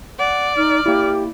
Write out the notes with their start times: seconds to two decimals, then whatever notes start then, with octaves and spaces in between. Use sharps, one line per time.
0.19 D5 F#5
0.57 D#4 F6
0.86 A#3 E4 G4